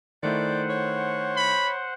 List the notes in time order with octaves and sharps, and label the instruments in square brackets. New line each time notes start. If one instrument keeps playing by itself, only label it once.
[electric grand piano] D#3 A3 E4 [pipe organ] C5 F#5 [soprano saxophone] D5
[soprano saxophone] C#5
[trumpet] B5